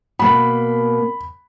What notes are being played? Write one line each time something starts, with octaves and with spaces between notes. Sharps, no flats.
B2 A#3 B5